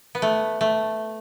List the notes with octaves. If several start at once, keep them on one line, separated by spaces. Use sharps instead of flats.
B3
A3
A3